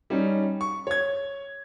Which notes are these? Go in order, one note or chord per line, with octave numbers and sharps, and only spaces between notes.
G3 C#4 D#4
C#6
C#5 G#6